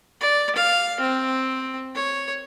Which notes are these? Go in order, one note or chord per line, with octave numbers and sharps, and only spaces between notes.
D5
F5
C4
C#5